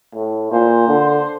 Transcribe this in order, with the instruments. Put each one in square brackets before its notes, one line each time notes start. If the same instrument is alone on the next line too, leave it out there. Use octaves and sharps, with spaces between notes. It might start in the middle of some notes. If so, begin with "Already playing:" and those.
[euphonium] A2
[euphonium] A#2 [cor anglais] C5
[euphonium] D3